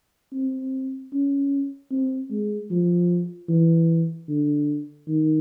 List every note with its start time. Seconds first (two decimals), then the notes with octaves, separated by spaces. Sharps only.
0.34 C4
1.13 C#4
1.92 C4
2.31 G#3
2.71 F3
3.49 E3
4.29 D3
5.08 D#3